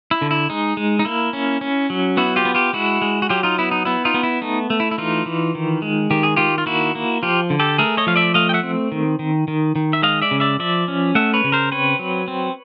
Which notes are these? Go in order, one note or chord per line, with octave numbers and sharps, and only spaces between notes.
E4
D3
E4
G#3 D#4
G#3
D#4
A#3 E4
C#4
C#4
F#3
B3 E4 F#4
F4 G4
B3
F4 G4
G#3 E4 F#4
G#3
F#4
F#3 F4 G4
D#4 F4
B3 E4
D#4
B3 E4
D#4 F4
B3
E4
A3 D#4
A3
E4
E4
E3 D#4 F4
E3
D#3
G#3
D#3 G4
G#4
D#3 F4 G4
F4
A#3 E4 F#4
A#3
F3 F4 G4
D3
G4 A4
A3 G#4 A#4
C#5 D#5
F3 F5
D5 E5
A3 D#5 F5
G5
E5 F#5
C4
D#3
D#3
D#3
D#3
E5
G#3 D#5 F5
D5 E5
C#3
D5 E5
F3 D5 E5
C#4
A3 E5 F#5
B4 C#5
C#3
A#4 C5
C4 B4 C#5
F#3
C4